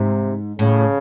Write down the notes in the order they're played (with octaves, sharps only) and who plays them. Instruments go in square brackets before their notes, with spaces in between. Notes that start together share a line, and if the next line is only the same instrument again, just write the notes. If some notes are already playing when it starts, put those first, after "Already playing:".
Already playing: [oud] G#2 [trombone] C3
[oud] A2 [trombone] C#3